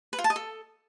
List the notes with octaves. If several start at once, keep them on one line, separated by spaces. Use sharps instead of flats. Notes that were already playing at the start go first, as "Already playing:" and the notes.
B4
F4
A5
D#5
A4